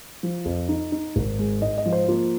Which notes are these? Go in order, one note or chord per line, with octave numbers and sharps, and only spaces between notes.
F3
F2
D#4
D#4
G#1
G#3
G#2 D#5
D#5
F3
C5
A#3 F4